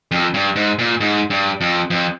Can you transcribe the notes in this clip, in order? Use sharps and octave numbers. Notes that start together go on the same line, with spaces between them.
F2
G2
G#2
A#2
G#2
G2
F2
F2